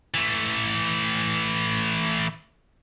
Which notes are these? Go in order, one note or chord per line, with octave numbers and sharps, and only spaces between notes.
E3 A3